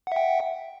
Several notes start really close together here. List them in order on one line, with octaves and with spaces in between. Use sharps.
F#5 E5 G5